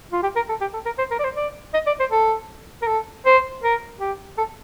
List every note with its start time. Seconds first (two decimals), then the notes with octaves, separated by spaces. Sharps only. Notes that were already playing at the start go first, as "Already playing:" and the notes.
0.12 F4
0.23 G4
0.36 A#4
0.49 A4
0.61 G4
0.74 A4
0.86 A#4
0.98 C5
1.11 A#4
1.19 D5
1.24 C5
1.36 D5
1.74 D#5
1.86 D5
2.00 C5
2.11 A4
2.82 A#4
2.87 A4
3.26 C5
3.63 A#4
4.00 G4
4.38 A4